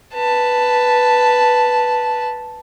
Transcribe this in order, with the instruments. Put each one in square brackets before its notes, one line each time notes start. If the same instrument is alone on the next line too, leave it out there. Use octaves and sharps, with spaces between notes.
[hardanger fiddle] B4 A5